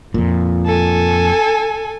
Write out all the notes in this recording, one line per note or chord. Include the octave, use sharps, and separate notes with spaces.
F2 A#2
A4 G#5